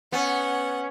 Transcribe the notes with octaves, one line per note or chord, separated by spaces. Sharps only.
B3 C#4 F#5